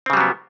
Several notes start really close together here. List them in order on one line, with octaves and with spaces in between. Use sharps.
C4 C#3 G3 F#3 B3